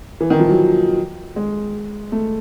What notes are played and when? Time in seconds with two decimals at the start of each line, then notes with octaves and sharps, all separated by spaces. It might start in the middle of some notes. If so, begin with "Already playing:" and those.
0.20 E3
0.30 D#3
0.40 F3
0.49 F#3
1.36 G#3
2.12 A3